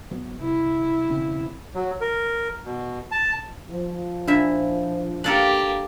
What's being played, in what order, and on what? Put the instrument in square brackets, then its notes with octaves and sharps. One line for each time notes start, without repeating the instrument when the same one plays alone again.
[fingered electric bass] G#1 F#3 B3
[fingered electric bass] C2 [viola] E4
[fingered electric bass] E1 C#3 C4
[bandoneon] F#3
A#4
B2
A5
[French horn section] F3
[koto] A#2 E4 E5 [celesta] D4
[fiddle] A#3 G4 [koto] D4 A4 A#4 [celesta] F5 A6 F#7